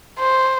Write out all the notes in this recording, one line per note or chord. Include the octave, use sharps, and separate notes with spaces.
C5